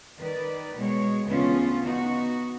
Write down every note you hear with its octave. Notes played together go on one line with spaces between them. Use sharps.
D#3 B4 D5
B2 G#3 C#5
D2 C#3 E3 B3 C#4 F4
B3 D#4 F#4